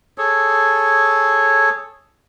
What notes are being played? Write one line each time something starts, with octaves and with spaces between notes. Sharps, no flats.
G#4 A4 C#5